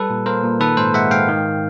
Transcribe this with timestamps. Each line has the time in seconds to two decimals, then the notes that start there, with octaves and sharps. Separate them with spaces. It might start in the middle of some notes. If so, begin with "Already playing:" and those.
Already playing: G3 A4 B4
0.10 A#2
0.26 A#3 A#4 C5
0.43 A#2
0.60 D#3 A4 B4
0.77 G#2 A#4 C5
0.94 G#3 E5 F#5
1.11 G#2 F5 G5
1.29 D#3